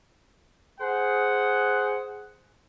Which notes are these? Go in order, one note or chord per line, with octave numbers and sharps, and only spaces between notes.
G#4 C5 F#5